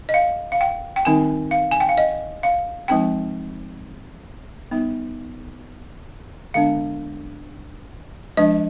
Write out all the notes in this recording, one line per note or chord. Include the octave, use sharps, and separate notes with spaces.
D#5
F5
F5
G5
G5
D#3 G3 C4 D#4 G#5
F5
G#5
G5
F5
D#5
F5
F3 G#3 C4 D#4 G5
G3 B3 D#4
D3 G#3 B3 D4 F5
F3 G#3 D4 D#5